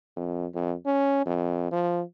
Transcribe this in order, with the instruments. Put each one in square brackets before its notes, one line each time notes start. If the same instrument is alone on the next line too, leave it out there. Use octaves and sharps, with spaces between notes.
[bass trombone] F2
F2
C#4
F2
F3